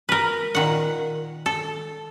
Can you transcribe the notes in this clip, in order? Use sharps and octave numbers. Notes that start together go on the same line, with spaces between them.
A#4 B4
A#2 D#3 F#5
A4